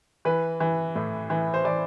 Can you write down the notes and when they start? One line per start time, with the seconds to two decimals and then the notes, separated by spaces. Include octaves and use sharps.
0.25 E3 B4
0.60 E3
0.96 A2
1.30 E3
1.54 C5
1.65 E3 D5